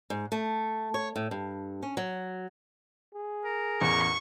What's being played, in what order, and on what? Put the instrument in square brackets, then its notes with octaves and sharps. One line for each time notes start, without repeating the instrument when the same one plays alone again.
[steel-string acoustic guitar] G#2
A3
C#5
A2
G2
C#4
F#3
[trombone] G#4
[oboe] A#4
[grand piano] A1 E2 [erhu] C#6